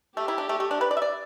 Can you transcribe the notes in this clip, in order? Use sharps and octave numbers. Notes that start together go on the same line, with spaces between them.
A3 G4
E4
D4
A3
A3
D4
B4
D5
E5
D5